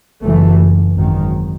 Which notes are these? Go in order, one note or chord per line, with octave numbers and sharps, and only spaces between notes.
F#1 F#2 E3 A3
G#1 F#2 D#3